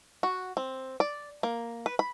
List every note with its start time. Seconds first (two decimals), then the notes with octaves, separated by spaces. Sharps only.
0.23 F#4
0.57 C4
1.00 D5
1.43 A#3
1.86 B4
1.99 B5